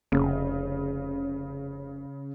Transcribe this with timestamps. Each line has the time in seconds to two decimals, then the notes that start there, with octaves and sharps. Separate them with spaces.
0.12 F1 C#3